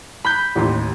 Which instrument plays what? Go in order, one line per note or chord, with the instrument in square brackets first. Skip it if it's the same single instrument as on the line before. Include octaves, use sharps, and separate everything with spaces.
[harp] B5 F#6 G6
[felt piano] A1 D#2 C6